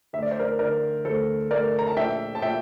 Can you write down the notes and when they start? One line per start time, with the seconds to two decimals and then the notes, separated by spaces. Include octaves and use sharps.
0.13 D2 E5
0.22 D5
0.31 C5
0.39 A#4 D5
0.59 D3 A#4 D5
1.05 D2 A4 C5
1.51 A3 A#4 D5
1.79 A#5
1.87 A5
1.97 A#1 E5 G5
2.35 A5
2.42 A#2 E5 G5